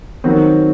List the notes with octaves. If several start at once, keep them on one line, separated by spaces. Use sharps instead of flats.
D#3 F#3 C4 F#4